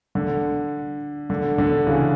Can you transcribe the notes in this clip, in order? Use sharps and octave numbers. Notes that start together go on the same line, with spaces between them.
D3
D3
D3
C#3 E3